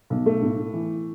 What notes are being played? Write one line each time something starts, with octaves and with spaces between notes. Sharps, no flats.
B1
A3
A2
E3